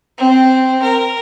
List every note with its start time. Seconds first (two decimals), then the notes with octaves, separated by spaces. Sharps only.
0.18 C4
0.82 A#4